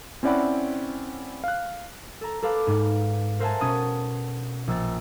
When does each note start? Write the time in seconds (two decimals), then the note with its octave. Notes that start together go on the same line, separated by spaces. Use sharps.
0.23 C4 C#4 E4 D5 F#5 B5
1.44 F5 F#6
2.21 A4 A#5
2.43 A4 B4 F5 D6
2.67 G#2
3.40 A#4 C5 E5 F#5 G#5 A5
3.60 B2 C#4 D#6 A6 E7
4.67 A#1 E6 A6